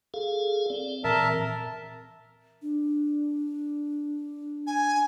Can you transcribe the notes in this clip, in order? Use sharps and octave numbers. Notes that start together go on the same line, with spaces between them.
G#4 A4 F5
C4 D5
A#2 E3 C4 A#4 E5 A5
D4
G#5